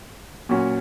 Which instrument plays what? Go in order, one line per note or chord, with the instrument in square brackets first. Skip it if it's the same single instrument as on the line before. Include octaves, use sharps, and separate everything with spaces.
[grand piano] A#2 F#3 C#4 F#4